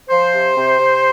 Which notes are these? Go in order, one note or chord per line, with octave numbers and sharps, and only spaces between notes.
F3 C5
C3
C3
C3